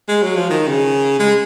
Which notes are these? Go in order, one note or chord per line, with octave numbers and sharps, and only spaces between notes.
G#3
F#3
F3
D#3
C#3
G#3